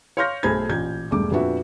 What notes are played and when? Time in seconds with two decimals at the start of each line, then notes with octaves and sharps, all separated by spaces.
0.17 C#5 F5 C6 F6 G6 A#6
0.43 B1 A3 G#4 C5 B5 G#6
0.69 A1 A#2 G6 G#6
1.11 E1 G2 A3 D6
1.31 F2 A#2 B3 D4 F#4 E5